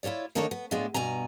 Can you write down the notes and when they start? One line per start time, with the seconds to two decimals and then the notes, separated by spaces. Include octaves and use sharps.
0.03 E4 F4 G#4 C#5 D5
0.35 D#3 A#3 D4 D#4 A4 C#5
0.51 B3
0.71 A2 G#3 B3 D4 F4
0.94 G2 B2 G#5 A#5